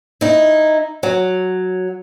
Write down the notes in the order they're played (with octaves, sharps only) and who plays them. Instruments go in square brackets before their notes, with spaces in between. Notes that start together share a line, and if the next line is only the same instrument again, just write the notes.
[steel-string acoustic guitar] D#4 E4
F#3